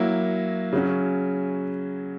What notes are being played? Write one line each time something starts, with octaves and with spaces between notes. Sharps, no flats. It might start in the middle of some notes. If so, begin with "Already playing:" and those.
Already playing: F#3 A#3 E4
C#3 F#3 C#4